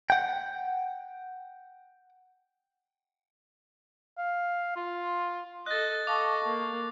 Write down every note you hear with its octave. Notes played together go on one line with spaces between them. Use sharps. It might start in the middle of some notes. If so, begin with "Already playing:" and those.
F#5 G5
F5
F4
A4 D#5 F#6 A6
A4 D#5 F5 A5 C#6 D6
A#3